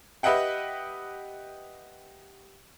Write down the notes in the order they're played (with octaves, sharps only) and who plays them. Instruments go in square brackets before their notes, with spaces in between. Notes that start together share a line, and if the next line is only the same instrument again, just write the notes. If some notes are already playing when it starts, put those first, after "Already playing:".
[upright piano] G4 B4 D#5 E5 F#5 G5